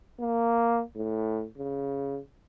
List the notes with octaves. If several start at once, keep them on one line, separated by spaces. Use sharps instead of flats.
A#3
A2
C#3